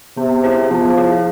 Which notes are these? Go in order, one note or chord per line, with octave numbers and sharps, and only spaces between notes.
C3 B3
E4 G#4 C5
F3 B3
E4 G#4 C5